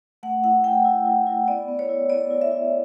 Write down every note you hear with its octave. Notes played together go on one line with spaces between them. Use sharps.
A3 F#5
E4 F#5
E4 G5
E4
E4
E4
B3 D5
B3
C#5
E4
B3 D5
E4
E5
E4